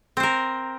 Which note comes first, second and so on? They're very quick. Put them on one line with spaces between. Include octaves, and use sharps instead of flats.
C4 C5 A#4